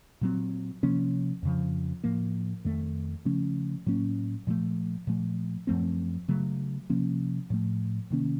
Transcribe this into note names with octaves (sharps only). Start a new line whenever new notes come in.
A#2 F#3 C4
C3 F3 A#3 C#4
F2 C#3 F3
A2 F3 A#3
F2 D#3 A3
C#3 F3 A3 C#4
A2 F#3 A#3 C#4
A#2 F3 A3
A#2 F3 A3
F#2 F3 A3 C4
C#3 F#3 A3
C3 F3 A#3 C#4
A2 F3 A3
C3 D#3 A#3 C#4